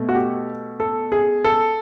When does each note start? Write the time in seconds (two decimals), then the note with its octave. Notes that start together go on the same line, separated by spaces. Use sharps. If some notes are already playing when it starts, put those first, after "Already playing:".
Already playing: B2 A3
0.09 F#4
0.15 G4
0.80 A4
1.12 G#4
1.44 A4